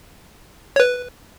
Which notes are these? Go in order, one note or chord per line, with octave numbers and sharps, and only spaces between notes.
C#5
B4